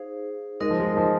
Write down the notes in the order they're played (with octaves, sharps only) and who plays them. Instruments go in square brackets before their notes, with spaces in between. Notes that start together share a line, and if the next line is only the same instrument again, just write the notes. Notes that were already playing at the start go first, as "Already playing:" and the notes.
Already playing: [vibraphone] D#4 G#4 C5 F5
[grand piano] G#3 [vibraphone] D#4 A#4 D#5
[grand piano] F3
G#3
F3